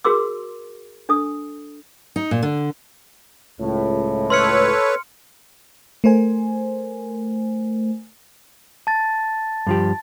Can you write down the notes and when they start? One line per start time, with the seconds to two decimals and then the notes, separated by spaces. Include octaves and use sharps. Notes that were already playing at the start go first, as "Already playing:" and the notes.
0.05 F#4 G#4 A#4 C6 D6 E6
1.09 D4 A4 D#6
2.16 D#4
2.31 A#2
2.43 D3
3.59 C#2 A2
4.30 A4 B4 C#5 C6 F6 C#7
6.04 A3 A#4 C5 G#5
8.87 A5 A6
9.67 G2 F3 G4